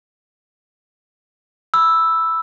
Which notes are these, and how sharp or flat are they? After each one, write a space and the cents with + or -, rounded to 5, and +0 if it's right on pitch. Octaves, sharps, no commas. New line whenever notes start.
B5 +0 E6 +0